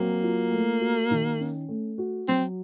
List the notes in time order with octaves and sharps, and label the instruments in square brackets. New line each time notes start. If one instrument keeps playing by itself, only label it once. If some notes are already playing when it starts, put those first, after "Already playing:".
Already playing: [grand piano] F#3 C4 [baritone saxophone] A#3
[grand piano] F4
A3
F#4
D#3
C#4
A3
F#4
[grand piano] F#3 [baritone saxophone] C4